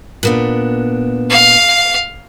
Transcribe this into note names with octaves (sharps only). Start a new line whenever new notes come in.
A#2 B3 D4
F5